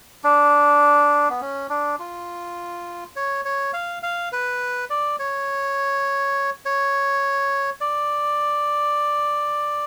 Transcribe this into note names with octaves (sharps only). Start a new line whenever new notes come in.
D4
B3
C#4
D4
F4
C#5
C#5
F5
F5
B4
D5
C#5
C#5
D5